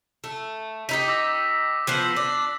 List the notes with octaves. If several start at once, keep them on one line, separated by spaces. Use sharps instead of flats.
A3
D#4 E4 G4 B6
D6 E6 A#6
E6
F3 B3 C5 E6 C7 F#7
D4